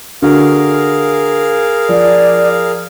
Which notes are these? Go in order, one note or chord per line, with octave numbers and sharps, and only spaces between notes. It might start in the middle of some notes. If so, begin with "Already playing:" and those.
D3 F#4 G#4 A#4 F5
F3 D5